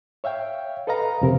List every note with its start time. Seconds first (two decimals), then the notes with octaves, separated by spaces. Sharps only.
0.24 C#5 E5 F5 G5
0.87 A4 B4 D#5 F5 A#5
1.21 F2 C3 A#4